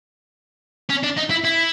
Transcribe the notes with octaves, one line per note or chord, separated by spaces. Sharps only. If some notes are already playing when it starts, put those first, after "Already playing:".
C#4
D4
D#4
E4
E4